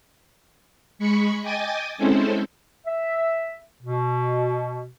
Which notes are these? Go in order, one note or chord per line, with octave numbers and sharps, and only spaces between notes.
G#3 B5 C#6 C#7
D#5 G5 G#5 D6 D#6 A6
G#3 C4 C#4 E4 A4 C5
E5
B2